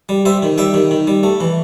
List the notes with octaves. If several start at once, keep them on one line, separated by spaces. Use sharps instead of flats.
G3
G3 C5 E5
D#3
G3 E5 G5
D#3
D#3
G3
A3
E3